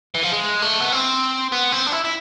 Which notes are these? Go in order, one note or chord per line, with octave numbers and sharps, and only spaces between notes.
E3
F3
G#3
A3
B3
C4
B3
C4
D4
E4
E4